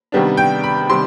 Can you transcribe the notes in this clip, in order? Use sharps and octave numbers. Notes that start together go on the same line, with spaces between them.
C3 D#3 G3 B3 D4
G5
B5
C3 D#3 G3 C6